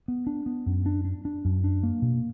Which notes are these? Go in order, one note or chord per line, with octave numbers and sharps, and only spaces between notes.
B3
D4
B3
F#2
D4
D4
D4
F#2
D4
A#3
B2